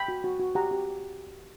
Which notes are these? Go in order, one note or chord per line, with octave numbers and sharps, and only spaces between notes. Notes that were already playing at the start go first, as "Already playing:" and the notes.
Already playing: G5 B5
F#4
F#4
F#4
G4 F#5 A#5
G4